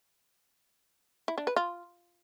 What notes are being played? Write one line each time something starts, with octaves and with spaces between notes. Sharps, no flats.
E4
D4
B4
F4